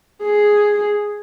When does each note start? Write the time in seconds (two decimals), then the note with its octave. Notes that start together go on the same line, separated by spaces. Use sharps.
0.23 G#4